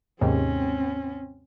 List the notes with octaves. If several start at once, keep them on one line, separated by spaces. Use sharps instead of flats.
D#2 G#2 C3 C4 C#4